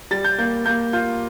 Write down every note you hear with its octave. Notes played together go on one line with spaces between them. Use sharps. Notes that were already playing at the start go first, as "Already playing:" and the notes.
G3 A6
G6
A#3 G6
A#3 G6
F4 G6